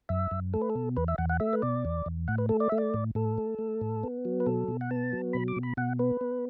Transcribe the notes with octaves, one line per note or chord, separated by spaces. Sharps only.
F#2 E5
F#2
A3 A4
B4
A4
B2
E2 B4
E5
E2 F#5
F#5
A3 E5
B4
B2 D5
E2
E2
A2 F#5
B4
A3 A4
D5
A3 E5
D5
A2
A2 A4
A3
A3
A2
B3
F#3
B4
B2 A4
B2
F#5
B3 A5
F#3
B2 B5
D6
B2
B5
B2 F#5
B3 B4
B3